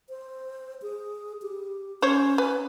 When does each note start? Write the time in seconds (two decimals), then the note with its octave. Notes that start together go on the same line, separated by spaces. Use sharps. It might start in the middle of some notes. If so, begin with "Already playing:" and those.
0.09 C5
0.82 G#4
1.42 G4
2.02 C#4 C5 C#5
2.38 B4